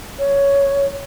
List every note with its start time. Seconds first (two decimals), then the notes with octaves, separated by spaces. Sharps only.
0.19 C#5